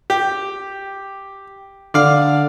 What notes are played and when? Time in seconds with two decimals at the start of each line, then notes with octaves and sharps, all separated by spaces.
0.10 G4
1.94 D3 D5 F5